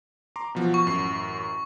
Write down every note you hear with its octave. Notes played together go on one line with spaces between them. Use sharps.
A#5 C6 D6
B2 F3 F#3
C#6
A1 F#2 C7